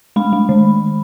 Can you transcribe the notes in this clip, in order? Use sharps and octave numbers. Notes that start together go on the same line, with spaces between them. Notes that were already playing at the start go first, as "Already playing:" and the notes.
G#3 B5
G#3
D#3